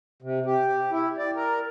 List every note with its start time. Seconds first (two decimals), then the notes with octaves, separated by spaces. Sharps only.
0.22 C3
0.46 G4
0.91 E4
1.18 D5
1.36 A#4